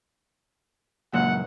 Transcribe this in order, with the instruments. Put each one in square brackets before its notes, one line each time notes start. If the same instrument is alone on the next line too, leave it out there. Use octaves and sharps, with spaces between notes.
[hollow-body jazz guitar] C#2 F#2 A#2 [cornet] F#5